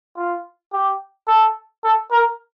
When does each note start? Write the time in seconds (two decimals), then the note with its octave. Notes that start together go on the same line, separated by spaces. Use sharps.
0.16 F4
0.73 G4
1.27 A4
1.84 A4
2.12 A#4